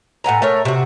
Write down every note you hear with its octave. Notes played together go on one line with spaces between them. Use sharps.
A2 F#5 G#5 A#5
A3 A#4 C#5
C3 F#4